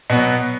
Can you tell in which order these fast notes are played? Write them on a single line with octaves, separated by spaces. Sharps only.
B2 B3 F#3